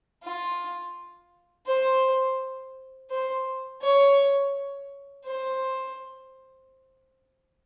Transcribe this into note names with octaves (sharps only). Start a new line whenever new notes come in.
F4
C5
C5
C#5
C5